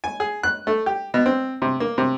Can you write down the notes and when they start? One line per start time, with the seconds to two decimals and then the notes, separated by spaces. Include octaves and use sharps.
0.04 G#5
0.20 G#4
0.43 F#6
0.67 A3
0.86 G4
1.14 B2
1.26 C4
1.62 C3
1.80 A#3
1.98 C3